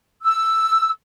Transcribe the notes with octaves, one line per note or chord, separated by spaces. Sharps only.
E6